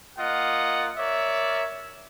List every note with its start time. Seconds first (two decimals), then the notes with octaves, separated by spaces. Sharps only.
0.18 A#3 F4 D#5 F#5
0.97 A#4 C#5 D5 E5